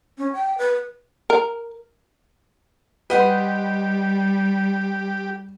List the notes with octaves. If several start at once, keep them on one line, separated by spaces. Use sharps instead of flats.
C#4
G5
B4
A#4
G3 G4 B4 D#5 F#5 C6